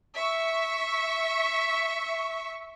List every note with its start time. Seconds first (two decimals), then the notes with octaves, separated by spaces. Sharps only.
0.15 E5 C#6